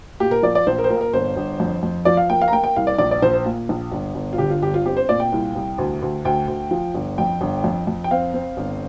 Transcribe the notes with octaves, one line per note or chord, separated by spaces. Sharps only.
A#2 G4
A#4
F3 D5
D5
A#1 C5
A#4
C5
A#2 A#4
A#4
G1 C5
G1
F2
F2
F3 D5
F5
A#3 G5
F5
A#5
A#3 G5
G5
C2 F5
D5
A#1 D5
D5
A#1 C5
C5
A#2
A#1
G1
G1
F4
D3 G4
F4
G1 G4
F4
C4 G4
C5
A#2 D5
G5
C2
C2
D2
D2
D2 G5
D2
F3
G1
F2 G5
G1
F2
F2
G5
C4 F5
C4
G1